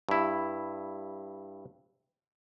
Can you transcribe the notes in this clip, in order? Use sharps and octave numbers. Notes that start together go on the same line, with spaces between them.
G2 E4